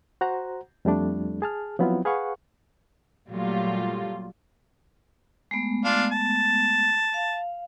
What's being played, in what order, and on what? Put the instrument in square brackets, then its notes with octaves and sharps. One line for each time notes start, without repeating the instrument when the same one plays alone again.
[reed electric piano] F#4 C5 F#5 A#5
F2 G3 A3 D4
G#4 A5 F6
F3 F#3 B3 C4 E4 F4
G#4 B4 F5 F#5 C#6
[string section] A#2 F#3 G3 A3 F4
[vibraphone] G#3 A3 B3
[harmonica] D4 F4 F5
A5
[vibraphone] F5